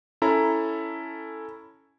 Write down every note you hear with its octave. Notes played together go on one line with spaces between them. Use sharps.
C#4 E4 A4 A#5